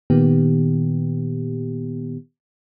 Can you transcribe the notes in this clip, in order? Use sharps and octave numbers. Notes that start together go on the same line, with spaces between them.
A#2 D#3 B3 G4